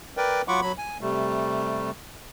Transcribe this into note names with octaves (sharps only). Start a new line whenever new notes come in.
A#4 B4 D5 G5
F#3 F4 F#5 B5 C#6 D6
F#3 B5
G#5
C3 G3 A3